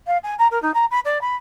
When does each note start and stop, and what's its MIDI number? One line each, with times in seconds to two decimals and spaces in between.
0.07 0.18 77
0.23 0.35 80
0.39 0.48 82
0.51 0.61 70
0.62 0.71 63
0.74 0.85 82
0.91 1.00 83
1.05 1.21 74
1.21 1.36 83